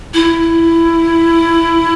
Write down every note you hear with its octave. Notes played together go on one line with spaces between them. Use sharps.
E4